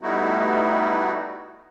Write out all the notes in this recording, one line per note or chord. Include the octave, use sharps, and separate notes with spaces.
G3 A3 B3 D#4 E4 F#4